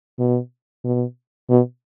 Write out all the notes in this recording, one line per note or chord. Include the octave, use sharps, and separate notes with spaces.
B2
B2
B2